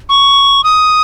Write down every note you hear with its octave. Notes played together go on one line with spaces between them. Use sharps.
C#6
D#6